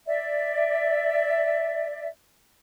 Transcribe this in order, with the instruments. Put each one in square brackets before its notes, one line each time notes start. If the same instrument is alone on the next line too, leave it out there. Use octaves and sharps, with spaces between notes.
[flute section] D5 E5